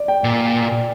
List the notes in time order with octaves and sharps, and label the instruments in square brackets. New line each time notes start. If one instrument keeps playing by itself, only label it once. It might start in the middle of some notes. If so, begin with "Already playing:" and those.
Already playing: [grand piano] D5
G5
[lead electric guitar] A#2